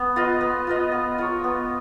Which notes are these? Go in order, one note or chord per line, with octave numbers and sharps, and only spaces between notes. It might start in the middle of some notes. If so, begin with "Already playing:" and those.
Already playing: B3
F4 B4 D#5
B3
F4 B4 D#5
B3
F4 A#4 C#5
B3